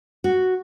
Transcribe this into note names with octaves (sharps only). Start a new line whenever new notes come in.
F#4